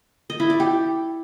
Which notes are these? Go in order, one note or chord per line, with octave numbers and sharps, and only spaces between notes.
D#5
E4
D5
G4